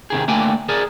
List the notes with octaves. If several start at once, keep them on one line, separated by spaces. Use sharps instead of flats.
C3 D#3 G#4
D3 A3 A#3 D5 G5 G#5
G#4 A#4 D5